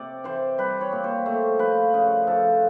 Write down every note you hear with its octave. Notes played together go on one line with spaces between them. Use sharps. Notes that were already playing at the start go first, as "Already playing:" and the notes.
Already playing: C3 D5
E3 C5
G3 B4
C#5
A#2
C5
A3 C5
F3 B4
C#3
F3 A4